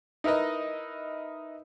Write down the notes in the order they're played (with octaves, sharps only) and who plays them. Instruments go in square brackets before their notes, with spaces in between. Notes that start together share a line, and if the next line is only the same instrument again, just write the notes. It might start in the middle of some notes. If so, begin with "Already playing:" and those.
[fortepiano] D#4 E4 A#4 B4 D#5